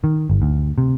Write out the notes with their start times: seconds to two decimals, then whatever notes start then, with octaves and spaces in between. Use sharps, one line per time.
0.04 D#3
0.30 G1
0.42 D2
0.78 C3